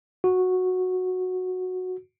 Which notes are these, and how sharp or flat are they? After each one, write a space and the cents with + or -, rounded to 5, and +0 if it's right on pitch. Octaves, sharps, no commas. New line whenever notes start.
F#4 -10